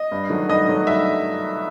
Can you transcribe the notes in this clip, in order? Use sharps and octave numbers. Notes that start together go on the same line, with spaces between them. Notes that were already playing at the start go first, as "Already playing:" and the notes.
Already playing: D#5
G2
D#3 F#3 A3
G2 D#5
D#3 F#3 A3
G2 E5